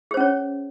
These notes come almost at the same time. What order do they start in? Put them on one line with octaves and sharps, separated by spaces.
G#4 C5 C#4 C#5